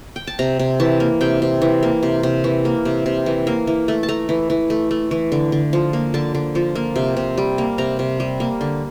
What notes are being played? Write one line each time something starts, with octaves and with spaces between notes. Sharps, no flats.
G5
A5
C3 A#5
C3
E3 A5
A#3
C3 G5
C3
E3
A#3
C3
C3
E3
A#3
C3
C3
E3
A#3
E3
A3
A5
A3 A#5
E3
E3
A3
A3
E3
D3
D3
F3
A#3
D3 A5
D3
F3
A#3
C3
C3
G3
A#3
C3 A#5
C3
G3
A#3
D3